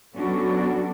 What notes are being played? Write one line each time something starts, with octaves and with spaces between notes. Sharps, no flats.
F#3 B3 C#4 D4 F#4 A4